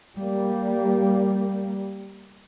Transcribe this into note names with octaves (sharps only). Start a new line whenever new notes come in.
G3 A#3